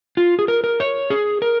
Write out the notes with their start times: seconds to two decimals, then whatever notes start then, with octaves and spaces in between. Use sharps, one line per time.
0.17 F4
0.39 G#4
0.48 A#4
0.64 A#4
0.80 C#5
1.10 G#4
1.42 A#4